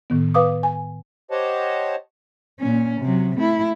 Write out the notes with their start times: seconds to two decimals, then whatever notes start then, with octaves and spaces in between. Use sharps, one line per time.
0.10 A2 D#3 B3
0.34 B4 F5 D6 D#6
0.63 G#5
1.31 G4 C5 C#5 D#5 F#5 A5
2.60 A#2 C#4
3.00 C3 F#3
3.38 A3 E4